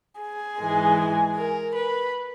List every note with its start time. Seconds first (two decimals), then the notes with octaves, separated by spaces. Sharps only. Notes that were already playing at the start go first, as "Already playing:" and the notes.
0.20 G#4
0.59 G#2 E3 G#3
1.36 A#4
1.75 B4